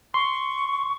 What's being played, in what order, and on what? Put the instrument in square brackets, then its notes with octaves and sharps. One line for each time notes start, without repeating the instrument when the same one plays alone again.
[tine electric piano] C6 [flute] C#6